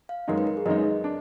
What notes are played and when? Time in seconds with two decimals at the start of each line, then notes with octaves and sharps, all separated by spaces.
0.09 F5
0.28 F#2 D#3 G#3 D#4 A#4
0.38 B4
0.47 A#4
0.57 G#4
0.66 F#2 D#3 G#3 D#4 D#5
1.04 D4